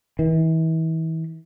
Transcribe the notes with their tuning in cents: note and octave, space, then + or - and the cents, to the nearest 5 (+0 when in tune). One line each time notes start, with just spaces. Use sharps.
E3 -35